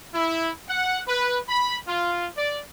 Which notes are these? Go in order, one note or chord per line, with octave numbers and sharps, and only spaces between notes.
E4
F#5
B4
B5
F4
D5